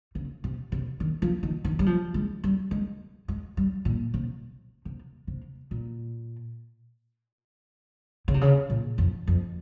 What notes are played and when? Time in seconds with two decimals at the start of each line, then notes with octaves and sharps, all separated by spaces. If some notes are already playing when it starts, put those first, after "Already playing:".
0.15 C#3
0.44 C3
0.72 C3
1.00 D#3
1.22 F3
1.43 D#3
1.64 D#3
1.79 G3
1.86 F3
2.14 G#3
2.44 G3
2.71 G#3
3.28 G#3
3.57 G3
3.85 A#2
4.14 C3
4.85 C3
5.27 C3
5.71 A#2
8.28 C#3
8.34 C3
8.41 C#3
8.70 A#2
8.98 F2
9.27 F2